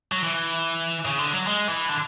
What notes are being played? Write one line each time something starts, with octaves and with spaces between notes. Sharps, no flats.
F#3
E3
C#3
D3
F#3
G#3
E3
D3